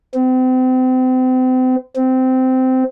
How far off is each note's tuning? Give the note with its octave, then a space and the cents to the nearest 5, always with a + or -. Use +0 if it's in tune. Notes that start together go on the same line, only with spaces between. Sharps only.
C4 -35
C4 -15